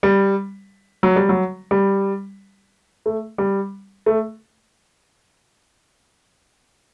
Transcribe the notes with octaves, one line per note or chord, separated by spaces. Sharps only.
G3
F#3
G3
F#3
G3
A3
G3
A3